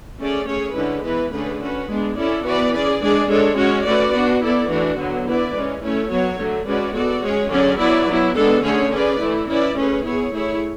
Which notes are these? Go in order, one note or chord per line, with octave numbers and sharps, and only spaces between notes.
A3 C#4 G#4 D5
A3 C#4 G#4 C#5
D3 G#3 C#4 E4 B4
E3 B3 E4 B4
D3 A3 C#4 G#4 B4
C#4 F#4 B4
G#3 B3 D4
C#4 E4 A4 D5
E3 B3 F#4 B4 D5
C#4 G#4 D5
G#3 D4 G#4 D5
G#3 D4 A4 C#5
G#3 C#4 F#4 C#5
A3 C#4 F#4 B4 D5
B3 D4 F#4
B3 E4 A4 D5
E3 A3 D4 F#4
D3 F#3 B3
B3 E4 B4 D5
E3 G#3 C#4
A3 C#4 E4 A4 C#5
F#3 B3 F#4 C#5
D3 F#3 A3
G#3 C#4 F#4 B4 D5
B3 F#4 A4 D5
G#3 C#4 G#4 C#5
D3 F#3 C#4 G#4 D5
F#3 B3 E4 B4 D5
F#3 B3 E4
G#3 B3 D4 A4
D3 A3 C#4 G#4 C#5
C#4 G#4 B4 D5
E3 A3 E4
C#4 E4 B4 D5
A3 C#4 G#4 B4
B3 E4 G#4 C#5
A3 E4 G#4 C#5